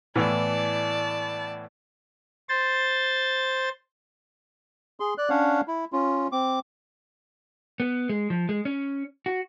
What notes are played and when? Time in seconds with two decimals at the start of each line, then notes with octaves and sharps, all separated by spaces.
0.16 A2 E3 B3 D5 A5
2.49 C5 A6
5.00 G#4 C6
5.18 D5 F#6
5.30 C#4 D4 C#5 F5 F#5
5.68 E4
5.93 C#4 F4
6.32 C4 D6
7.80 B3
8.09 G#3
8.30 F3
8.49 G#3
8.65 C#4
9.26 F#4